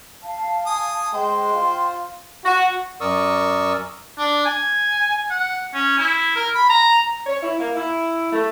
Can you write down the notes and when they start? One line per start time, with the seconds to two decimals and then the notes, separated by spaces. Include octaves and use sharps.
0.23 F5 A5
0.66 G#5 D#6
1.14 G#3 C5 G5
1.54 F4
2.45 F#4
3.01 F#2 A#4 D5 C#6 D#6 E6
4.18 D4
4.45 G#5
5.30 F#5
5.74 C#4
5.98 E4
6.36 A#4
6.55 B5
6.69 A#5
7.26 C#5
7.43 E4
7.59 A#3
7.75 E4
8.32 A3